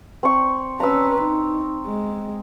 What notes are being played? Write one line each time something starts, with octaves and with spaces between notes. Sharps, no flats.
C4 C#6
C#4 B4 A#5 E6
D#4
G#3